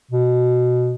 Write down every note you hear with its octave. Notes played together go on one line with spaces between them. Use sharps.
B2